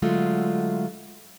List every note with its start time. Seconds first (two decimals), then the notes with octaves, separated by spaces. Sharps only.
0.02 D3 F#3 G#3 A3 F4